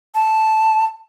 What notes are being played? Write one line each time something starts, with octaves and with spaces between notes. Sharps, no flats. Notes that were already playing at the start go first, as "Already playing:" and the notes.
A5